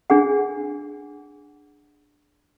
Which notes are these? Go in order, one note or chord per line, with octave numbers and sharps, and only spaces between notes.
D4 G#4 F#5